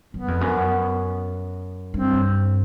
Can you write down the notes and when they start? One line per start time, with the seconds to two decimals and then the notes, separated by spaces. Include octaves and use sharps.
0.14 F#2 B3
0.28 F2
0.41 F#2
1.94 G2 C4